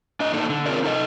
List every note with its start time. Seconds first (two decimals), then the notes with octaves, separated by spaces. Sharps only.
0.20 D4 D#5
0.34 A#3 D4 D#4 A4
0.50 D3
0.66 C4 C#4 F4 G#4 A#4 D5
0.84 D#4 A4 D#5